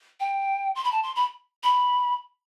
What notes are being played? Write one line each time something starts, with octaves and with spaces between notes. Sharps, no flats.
G5
C6
B5
A5
C6
B5
B5